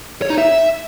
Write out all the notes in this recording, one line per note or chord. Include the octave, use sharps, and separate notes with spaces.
C#5
D#4
E5